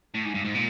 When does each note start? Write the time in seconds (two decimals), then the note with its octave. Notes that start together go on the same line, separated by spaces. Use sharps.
0.14 A2
0.25 G#2
0.34 G2
0.45 G#2
0.55 A#2